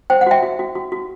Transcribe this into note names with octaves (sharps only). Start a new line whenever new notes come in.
C5 G5
F#5
F#4 E5 G5
F#4
F#4
F#4
F#4